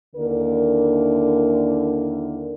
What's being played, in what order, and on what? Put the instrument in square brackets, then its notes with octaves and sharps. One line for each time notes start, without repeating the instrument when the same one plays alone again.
[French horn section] D#2 D3 E4 A#4